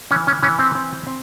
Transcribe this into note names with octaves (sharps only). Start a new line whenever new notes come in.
E3 C#4
C#4
E3 C#4
C4
C4
C4